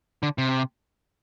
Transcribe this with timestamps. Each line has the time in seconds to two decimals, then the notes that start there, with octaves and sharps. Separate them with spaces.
0.23 D3
0.38 C3